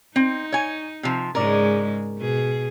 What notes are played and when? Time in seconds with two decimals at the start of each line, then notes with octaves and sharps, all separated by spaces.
0.16 C4 D#4
0.52 C#5 G#5
1.03 C3 F3
1.35 G#2 C#3 G#3 A#4 D5
2.18 B2 G#4